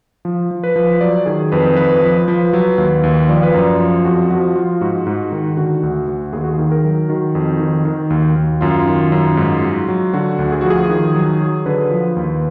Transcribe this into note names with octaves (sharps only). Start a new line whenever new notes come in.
F3
F3
B4
F3
F#3 D5
D#3 G#4
F2 B4
F3 B4
F3
F3
F#3
D#2
D#2
F3 D5
B4
F#2 D5
F3
F2 F#4
F3 F#4
F3 F4
G#2 F#4
G#2
D#3
D3 F#4
D2
D2
D#2 G#4
F#4
D#3 G#4
A#4
F#3
D#3 F#4
F2
D#3
D#3
D#2
D#2
F#2 F4
D#3
F#2
G#2
F#3
F#3
D3 F#4
D2
G#4
F3 F#4
G#4
D#3
F#3
F#3
D3 B4
F3
D#2